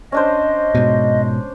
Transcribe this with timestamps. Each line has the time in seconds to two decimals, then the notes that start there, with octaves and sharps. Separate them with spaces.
0.12 C#4 D4 C5 D#5
0.75 G#2 B2